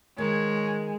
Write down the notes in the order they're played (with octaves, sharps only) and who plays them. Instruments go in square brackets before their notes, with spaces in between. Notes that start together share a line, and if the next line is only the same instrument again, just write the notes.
[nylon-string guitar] D#3 [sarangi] G#3 [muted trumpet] C#5